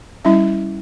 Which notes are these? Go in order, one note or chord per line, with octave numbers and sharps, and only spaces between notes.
G3 C#4 E4 E5